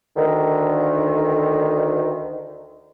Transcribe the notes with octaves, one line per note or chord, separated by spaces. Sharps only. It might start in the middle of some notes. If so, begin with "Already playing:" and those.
D2 D3 D#3